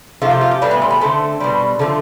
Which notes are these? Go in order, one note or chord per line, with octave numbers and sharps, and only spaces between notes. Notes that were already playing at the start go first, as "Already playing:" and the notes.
C3 F3 A3 F4
G4
F4
G4
A2 E3 G3 D4
B3
C4
B3
D3 A3 C4
B2 G3
D3 F3 A3